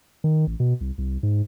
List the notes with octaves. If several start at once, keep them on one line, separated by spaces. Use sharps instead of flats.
D#3
A1
B2
C2
C2
G#2